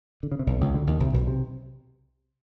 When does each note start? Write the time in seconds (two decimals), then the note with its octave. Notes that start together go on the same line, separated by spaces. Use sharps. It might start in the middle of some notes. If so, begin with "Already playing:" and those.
0.23 D3
0.32 C#3
0.39 C3
0.47 B1 B2
0.61 C#2 C#3
0.74 D2 D3
0.87 D#2 D#3
1.00 C2 C3
1.13 B1 B2
1.27 C3